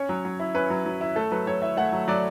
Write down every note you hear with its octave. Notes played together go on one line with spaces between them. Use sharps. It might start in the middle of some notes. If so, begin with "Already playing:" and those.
Already playing: C#4 C#5
F#3
F#3
E4
C#4 B4
F#3
F#3
E4
A3 A4
F#3 B4
F#3 C#5
E4 E5
A3 F#5
F#3
F#3 D5